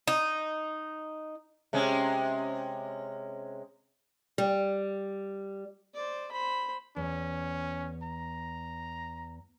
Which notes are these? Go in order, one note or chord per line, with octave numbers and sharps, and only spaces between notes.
D#4
C3 G#3 C#4
G3
C5 D5
C5 B5
E2 C#4
A#5